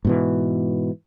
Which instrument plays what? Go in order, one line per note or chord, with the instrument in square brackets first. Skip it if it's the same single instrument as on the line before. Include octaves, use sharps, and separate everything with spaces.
[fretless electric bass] G#2 B2 E3